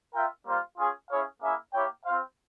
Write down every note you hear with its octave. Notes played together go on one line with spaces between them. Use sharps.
F4 A#4 E5 G5
G3 A#3 F4 C5
C#4 F4 G#4
C#4 E4 G#4 C#5 F5
A#3 C#4 E4 G#4 E5
A#3 E4 G4 C#5 G5
C4 F4 C5 F5